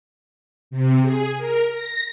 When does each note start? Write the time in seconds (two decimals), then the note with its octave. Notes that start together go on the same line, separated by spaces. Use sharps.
0.71 C3
1.02 G#4
1.38 A#4
1.72 A#6